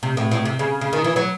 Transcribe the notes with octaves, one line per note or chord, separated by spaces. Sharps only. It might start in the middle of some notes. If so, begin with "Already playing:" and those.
C3
A2
A2
C3
C#3
C#3
D#3
E3
F#3